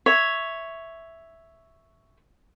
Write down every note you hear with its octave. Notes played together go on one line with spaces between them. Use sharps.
C#5 E5